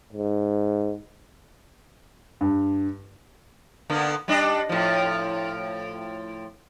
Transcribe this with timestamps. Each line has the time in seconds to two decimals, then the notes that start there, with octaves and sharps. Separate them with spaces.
0.13 G#2
2.41 G2
3.90 D3 A#3 B3
4.28 G3 D4 D#5
4.69 A2 F3